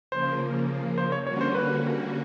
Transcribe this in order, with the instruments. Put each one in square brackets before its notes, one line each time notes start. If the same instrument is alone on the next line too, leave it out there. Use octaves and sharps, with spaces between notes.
[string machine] C#3 F3 A#3 [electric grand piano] C5
[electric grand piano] C5
C#5
[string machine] D3 G3 A#3 C#4 F#4 [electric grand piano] C#5
[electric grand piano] C5
B4